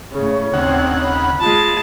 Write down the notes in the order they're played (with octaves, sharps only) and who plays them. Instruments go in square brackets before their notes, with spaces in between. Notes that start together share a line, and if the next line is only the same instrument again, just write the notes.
[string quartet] A2 C#3 [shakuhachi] C#5
[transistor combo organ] D#2 C#3 F#5 [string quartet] C4 D4
[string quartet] B5
[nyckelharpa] G#3 A5 [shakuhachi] F4